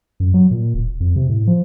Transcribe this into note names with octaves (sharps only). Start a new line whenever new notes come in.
F#2
F#3
A#2
D#1
F2
C3
A2
F3